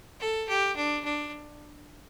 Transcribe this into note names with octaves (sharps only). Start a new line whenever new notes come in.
A4
G4
D4
D4